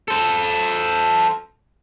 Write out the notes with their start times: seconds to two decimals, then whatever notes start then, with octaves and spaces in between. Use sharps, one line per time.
0.08 A4 C5